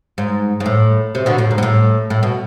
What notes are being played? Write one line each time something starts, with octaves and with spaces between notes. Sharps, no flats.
G#2
G#2
A2
C3
B2 D3
A2
G#2
B2
A2
A2
B2